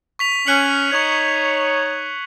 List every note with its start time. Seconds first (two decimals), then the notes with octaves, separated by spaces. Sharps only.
0.19 C#6 B6 F7
0.47 C#4 F#6 C#7 F#7
0.92 D#4 C#5 C#6 G#6